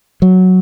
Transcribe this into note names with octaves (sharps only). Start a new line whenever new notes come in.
F#3